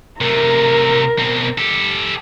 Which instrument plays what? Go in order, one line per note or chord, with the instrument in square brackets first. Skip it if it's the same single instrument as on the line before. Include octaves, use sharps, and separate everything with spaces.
[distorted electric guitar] C3 A3 [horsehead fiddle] A#4
[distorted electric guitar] B2 C4
G4 A4